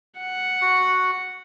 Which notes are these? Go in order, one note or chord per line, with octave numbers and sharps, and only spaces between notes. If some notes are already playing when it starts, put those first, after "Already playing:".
F#5
F#4